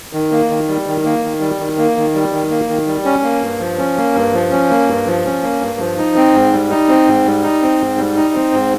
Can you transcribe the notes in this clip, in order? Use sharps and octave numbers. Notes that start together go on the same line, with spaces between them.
D#3
A#3
D#3
G3
D#3
A#3
D#3
G3
D#3
A#3
D#3
G3
D#3
A#3
D#3
G3
C#4
A#3
G2
F3
C#4
A#3
G2
F3
C#4
A#3
G2
F3
C#4
A#3
G2
F3
D#4
C4
G#2
G3
D#4
C4
G#2
G3
D#4
C4
G#2
G3
D#4
C4
G#2